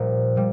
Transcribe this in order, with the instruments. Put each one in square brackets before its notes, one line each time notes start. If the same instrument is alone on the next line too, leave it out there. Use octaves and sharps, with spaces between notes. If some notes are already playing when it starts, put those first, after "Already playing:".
Already playing: [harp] A#1 A#2 G3
A#2 G3